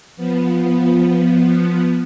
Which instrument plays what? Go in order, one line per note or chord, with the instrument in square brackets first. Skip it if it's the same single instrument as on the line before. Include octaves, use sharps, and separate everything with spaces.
[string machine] F3 B3